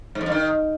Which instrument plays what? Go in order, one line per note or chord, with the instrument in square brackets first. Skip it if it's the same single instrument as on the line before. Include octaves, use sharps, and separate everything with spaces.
[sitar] G#2
F2
G2
D#3